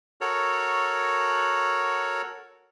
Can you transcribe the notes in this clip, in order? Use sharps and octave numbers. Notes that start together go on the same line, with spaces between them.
F#4 A4 A#4 C#5